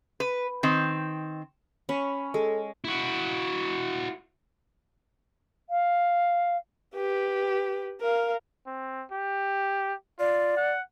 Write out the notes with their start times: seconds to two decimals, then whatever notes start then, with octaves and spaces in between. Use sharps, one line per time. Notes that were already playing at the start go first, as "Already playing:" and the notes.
0.20 B4
0.63 D#3 C4
1.89 C#4 B5
2.34 G#3 A4
2.85 E4 F#4
5.69 F5
6.95 G4 B4
8.01 A#4 F5
8.66 C4
9.12 G4
10.20 F4 D5
10.57 F#5